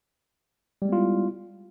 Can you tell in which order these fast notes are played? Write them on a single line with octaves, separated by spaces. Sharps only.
G3 G#3 B3 F4 E4